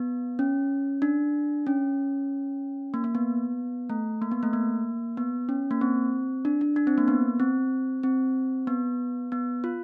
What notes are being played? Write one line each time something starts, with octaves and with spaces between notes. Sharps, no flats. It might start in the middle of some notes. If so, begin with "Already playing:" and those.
Already playing: B3
C#4
D4
C#4
A#3
A#3
B3
A3
A#3
B3
A3
A#3
B3
C#4
A#3
C4
D4
D4
D4
C4
A#3
B3
C4
C4
B3
B3
F4